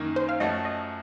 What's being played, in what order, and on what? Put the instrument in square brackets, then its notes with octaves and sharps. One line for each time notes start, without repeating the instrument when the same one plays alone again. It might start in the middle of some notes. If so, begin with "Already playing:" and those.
Already playing: [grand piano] F#2 D#3 A#3
[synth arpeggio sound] C5
F5
[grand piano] F#2 F3 A3 C#4 F#4 [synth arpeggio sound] D#5
[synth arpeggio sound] D#5